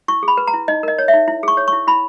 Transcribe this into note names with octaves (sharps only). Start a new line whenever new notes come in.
E4 C#6
G#4
B5
B4
A#5
E4
D#4 D#5
A#4 D#5
C#5
E5
D#4
E4
G#4 C#6
C#5
C#6
E4
E4 B5